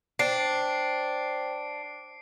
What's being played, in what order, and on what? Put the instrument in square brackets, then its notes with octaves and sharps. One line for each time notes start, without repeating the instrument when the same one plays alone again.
[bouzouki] D4 [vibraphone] C5 G5 [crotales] C7 D7